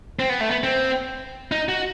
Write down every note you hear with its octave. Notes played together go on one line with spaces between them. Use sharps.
C4
B3
A3
B3
C4
D#4
F#4